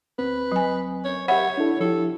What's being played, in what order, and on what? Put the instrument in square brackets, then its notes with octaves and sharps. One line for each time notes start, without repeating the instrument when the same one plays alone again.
[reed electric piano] D2 C4 [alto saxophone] B4
[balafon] F#3 G#5
[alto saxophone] C#5
[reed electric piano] G4 E5 B5 [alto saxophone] C#5 [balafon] F#5
[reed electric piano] D4 E4 A4
[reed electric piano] F3 E4 G4 [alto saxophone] A4